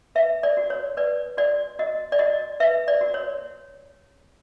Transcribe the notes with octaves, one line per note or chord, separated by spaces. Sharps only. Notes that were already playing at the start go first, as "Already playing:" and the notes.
B4 E5
D5
F#4
C#5
B4 D5
F#4 D5
F#4 D#5
D5
F#4 D#5
B4 E5
D5
F#4
C#5